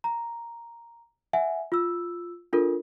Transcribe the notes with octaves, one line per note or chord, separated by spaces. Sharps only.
A#5
E5 F#5 G#5
F4 E6
D4 F4 A4 A#4